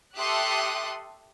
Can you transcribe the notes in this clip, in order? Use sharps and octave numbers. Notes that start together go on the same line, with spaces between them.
G4 A4 E5 C6 D#6 F#6